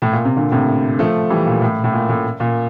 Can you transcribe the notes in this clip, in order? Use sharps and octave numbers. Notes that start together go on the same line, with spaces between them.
A2
A#2
C3
A#2 D3
A2 C3
F3 A3
E3 G3
A#2
A2
A2
A#2
A2
A#2